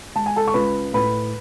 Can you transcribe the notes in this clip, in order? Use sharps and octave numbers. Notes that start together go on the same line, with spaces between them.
G#3 A5
G#5
A4 A5
C#6
C#2 B4 B5
A2 B4 B5